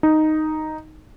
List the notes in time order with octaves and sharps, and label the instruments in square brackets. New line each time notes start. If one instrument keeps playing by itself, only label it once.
[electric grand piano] D#4